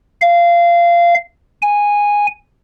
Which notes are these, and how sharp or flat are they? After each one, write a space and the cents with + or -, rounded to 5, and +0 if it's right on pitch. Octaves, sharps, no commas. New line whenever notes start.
F5 -20
G#5 -10